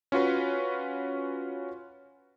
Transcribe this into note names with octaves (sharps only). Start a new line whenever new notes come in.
C#4 F4 F#4 B4